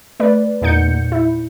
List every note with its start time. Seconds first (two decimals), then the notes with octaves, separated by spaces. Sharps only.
0.20 A3 B4 D5
0.61 E2 A#2 D#4 F#5 G6 C#7
0.87 A#2
1.12 E4